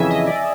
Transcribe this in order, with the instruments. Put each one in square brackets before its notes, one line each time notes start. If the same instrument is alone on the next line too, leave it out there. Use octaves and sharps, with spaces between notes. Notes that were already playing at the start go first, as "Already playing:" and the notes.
Already playing: [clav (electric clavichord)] F2 C#3 E3 [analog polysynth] E5 G#5
[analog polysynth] D#5
D5